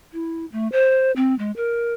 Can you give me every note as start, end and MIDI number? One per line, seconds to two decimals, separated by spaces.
0.13 0.45 64
0.52 0.68 57
0.72 1.11 72
1.16 1.35 60
1.39 1.51 56
1.56 1.94 70